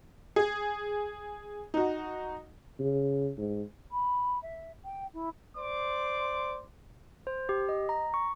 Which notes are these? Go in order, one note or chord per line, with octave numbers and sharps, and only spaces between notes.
G#4
D#4 F#4
C#3
G#2
B5
E5
G5
E4
C5 D5 C6 D6
C5
G4
D#5
A#5
C#6